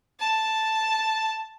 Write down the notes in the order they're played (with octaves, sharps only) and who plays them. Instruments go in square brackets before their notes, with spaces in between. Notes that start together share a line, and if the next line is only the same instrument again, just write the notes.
[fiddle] A5